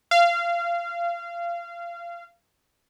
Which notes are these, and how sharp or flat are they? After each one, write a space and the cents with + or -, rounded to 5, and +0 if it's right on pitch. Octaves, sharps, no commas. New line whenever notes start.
F5 -25